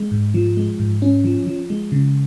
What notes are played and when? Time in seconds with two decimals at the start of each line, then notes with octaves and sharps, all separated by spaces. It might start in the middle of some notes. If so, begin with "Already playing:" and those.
Already playing: G#3
0.11 G#2
0.34 F3
0.57 G#3
0.79 G#2
1.02 C#4
1.24 F3
1.47 F3
1.70 G#3
1.92 C#3